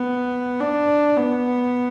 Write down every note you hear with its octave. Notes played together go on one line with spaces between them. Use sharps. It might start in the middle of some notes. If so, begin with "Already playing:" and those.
Already playing: B3
D4
B3